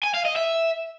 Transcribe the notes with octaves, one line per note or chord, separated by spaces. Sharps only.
G#5
F5
D#5
E5